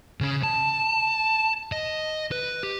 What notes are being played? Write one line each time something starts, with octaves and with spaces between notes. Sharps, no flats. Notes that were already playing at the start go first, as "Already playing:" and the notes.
C#3 C#4
A5
D#5
B4
G4